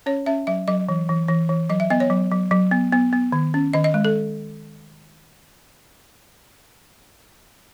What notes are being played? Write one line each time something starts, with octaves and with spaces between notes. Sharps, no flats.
C#4 C#5
C#4 E5
F#3 E5
F#3 D#5
E3
E3
E3
E3
F#3 D#5
E5
B3 D#5
C#5
F#3
F#3
F#3
B3
B3
B3
D#3
C#4
D#3 D#5
D#5
G#3
A4